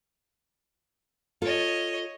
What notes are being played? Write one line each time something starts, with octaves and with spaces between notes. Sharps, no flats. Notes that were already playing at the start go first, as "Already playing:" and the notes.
F4 A4 C#5 D#5